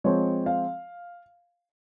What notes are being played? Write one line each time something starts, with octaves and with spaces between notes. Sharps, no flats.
F3 G#3 C4 C#5
F5